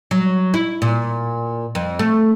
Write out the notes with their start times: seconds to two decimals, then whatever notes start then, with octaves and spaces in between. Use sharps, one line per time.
0.11 F#3
0.54 E4
0.82 A#2
1.75 F2
1.99 A3